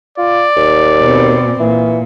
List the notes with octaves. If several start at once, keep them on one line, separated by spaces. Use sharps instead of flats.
F4 D5
D#2
B2 C4
A#2 E3